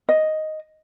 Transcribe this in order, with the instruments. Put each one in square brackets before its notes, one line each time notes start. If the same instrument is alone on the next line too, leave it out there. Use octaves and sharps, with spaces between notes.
[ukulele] D#5